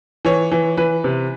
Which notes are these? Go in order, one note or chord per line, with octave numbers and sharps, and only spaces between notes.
E3 C#5
E3
E3 B4
C3